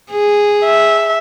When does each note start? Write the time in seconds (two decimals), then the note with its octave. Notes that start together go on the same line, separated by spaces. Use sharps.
0.12 G#4
0.64 E5